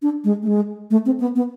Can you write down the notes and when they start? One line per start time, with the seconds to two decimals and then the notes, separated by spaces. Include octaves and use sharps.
0.02 D4
0.24 G#3
0.43 A3
0.47 G#3
0.91 A3
1.06 C4
1.20 B3
1.36 B3